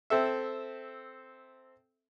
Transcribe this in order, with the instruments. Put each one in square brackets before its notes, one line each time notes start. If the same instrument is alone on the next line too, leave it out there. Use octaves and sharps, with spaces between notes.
[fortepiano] C4 A4 E5